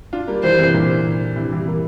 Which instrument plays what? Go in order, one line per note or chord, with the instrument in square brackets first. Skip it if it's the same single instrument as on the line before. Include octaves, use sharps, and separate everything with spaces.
[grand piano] D4 F4
G3 A#3
[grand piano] E3 G3 [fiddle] C5
[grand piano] C3 E3
A#2 D3
C3 E3
E3 G3
G3 A#3